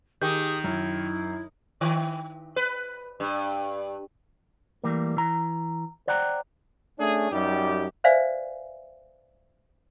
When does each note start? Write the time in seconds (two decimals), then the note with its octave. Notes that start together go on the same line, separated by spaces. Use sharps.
0.22 D#3 G4 G#4 D#6 G6
0.64 F#2 E4
1.81 D#3
2.56 B4
3.20 G2
4.84 E3 G3 A3 A#3
5.17 E3 A#5
6.08 C5 D5 F#5 G5 A#5
6.99 A3 C#4 D4 G#4
7.32 F#2 G3 D#4 G4
8.04 B4 C5 D5 E5 F5 G#5